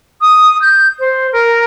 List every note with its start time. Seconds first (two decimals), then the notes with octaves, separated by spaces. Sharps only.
0.21 D#6
0.62 G6
0.99 C5
1.32 A#4